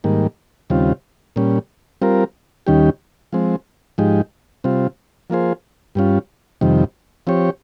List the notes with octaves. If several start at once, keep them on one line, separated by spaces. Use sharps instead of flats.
G#2 D#3 G3 A#3
D#2 C#3 G3 C4 F4
A#2 G3 C#4
G3 C4 F4 A#4
D#2 D#3 G3 C#4 G4
F3 G#3 C4
G#2 F3 G#3 D#4 G4
C3 G3 C4 F4
F3 A#3 F4 G#4 C5
G2 G3 C#4 F4
F2 C3 D#3 G3
F3 C4 G4 C#5